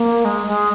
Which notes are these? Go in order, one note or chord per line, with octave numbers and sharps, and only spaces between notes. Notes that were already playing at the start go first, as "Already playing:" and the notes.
Already playing: A#3
G#3
G#3